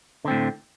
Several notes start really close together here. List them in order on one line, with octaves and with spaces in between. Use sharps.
D3 C4 A2